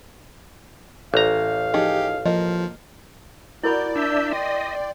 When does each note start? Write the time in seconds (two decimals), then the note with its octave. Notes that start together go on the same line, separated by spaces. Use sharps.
1.14 A1 F5 A#5
1.74 F3 D#4 G4 G#4
2.26 F3 A#3 A#4 D#5
3.63 E4 F#4 A#4 D5 B5 G6
3.96 D4 E5 E6 G6
4.33 D#5 G5 C6